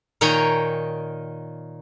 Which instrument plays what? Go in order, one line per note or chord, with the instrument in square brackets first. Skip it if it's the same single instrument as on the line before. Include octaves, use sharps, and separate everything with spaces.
[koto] A#2 D#3 C#5 G5 G#5 A#5